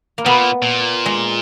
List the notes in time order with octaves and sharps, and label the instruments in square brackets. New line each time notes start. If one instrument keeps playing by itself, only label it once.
[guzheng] A#3
[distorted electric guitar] B2 [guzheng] B3
[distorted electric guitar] A#2
A#2
[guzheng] G#3